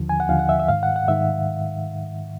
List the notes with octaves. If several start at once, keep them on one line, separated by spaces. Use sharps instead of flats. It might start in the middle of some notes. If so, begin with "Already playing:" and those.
Already playing: D#2 D3 F3
G#5
F#5
D#2 D3 F3 F5
F#5
E5
E5
G#2 D#3 F5
F#5
F#5
G#2 D#3 E5